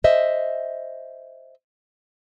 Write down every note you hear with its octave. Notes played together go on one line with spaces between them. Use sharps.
C5 D#5 E5